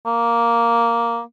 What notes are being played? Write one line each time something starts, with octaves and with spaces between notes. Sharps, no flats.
A#3